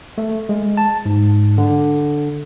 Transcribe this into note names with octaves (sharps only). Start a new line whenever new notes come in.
A3
G#3
A5
G#2
D3